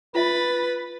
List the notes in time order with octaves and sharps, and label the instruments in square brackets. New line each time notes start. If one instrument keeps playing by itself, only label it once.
[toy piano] F4 E5 [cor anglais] B4 [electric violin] B5 A6